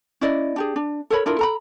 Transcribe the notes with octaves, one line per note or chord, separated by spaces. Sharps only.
C#4 E4 D5 D#5
D4 G4 G#4
D4
A4 A#4 C#5 B5
D4 E4 F4 A#4
A4 A#5 B5